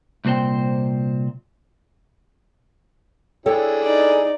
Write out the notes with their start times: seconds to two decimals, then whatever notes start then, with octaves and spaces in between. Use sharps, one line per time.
0.25 C2 A#2 C4 C5 G5
3.46 D4 E4 G#4 A4 C#5 G5
3.82 D#4 D5